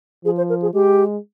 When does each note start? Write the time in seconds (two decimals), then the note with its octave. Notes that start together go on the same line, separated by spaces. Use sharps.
0.25 F3 G#4
0.37 C5
0.49 A#4
0.62 G#4
0.74 G#3 G4